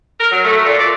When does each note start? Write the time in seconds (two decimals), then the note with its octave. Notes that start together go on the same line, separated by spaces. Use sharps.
0.19 A#4
0.31 F#3
0.45 A3
0.66 A#2
0.78 D5